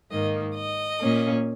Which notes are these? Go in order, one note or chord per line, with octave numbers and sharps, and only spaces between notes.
G#2 D#3 A#3 D#5
D#5
A#2 A#3 C#4